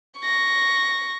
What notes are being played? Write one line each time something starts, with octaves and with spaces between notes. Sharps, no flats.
C#6 A#6